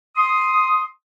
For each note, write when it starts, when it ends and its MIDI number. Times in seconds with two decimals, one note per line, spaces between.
0.16 0.83 84
0.16 0.83 87